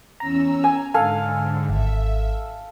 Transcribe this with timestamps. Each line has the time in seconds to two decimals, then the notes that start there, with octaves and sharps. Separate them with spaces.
0.20 E2 C#4 A#5 E6
0.64 G#5
0.94 G#2 D3 A4 F5 G#5
1.69 G#1 E5